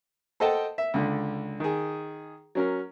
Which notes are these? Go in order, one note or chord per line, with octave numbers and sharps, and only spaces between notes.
A4 C5 D#5 F#5 G5 A5
E5
C#2 D3
D#3 G#4
F#3 C#4 A#4